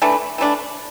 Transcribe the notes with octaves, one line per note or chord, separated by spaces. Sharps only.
E3 A3 D4
E3 A3 D4